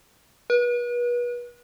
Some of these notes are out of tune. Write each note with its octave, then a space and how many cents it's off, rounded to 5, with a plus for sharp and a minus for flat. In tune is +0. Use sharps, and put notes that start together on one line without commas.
B4 -35